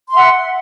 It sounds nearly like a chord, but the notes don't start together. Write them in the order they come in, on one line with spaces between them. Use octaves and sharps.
C6 E5 F#5